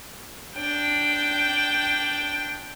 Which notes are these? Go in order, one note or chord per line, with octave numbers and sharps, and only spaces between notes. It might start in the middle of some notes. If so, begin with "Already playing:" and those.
D4 G5